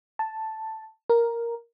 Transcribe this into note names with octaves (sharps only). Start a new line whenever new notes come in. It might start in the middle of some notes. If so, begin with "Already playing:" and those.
A5
A#4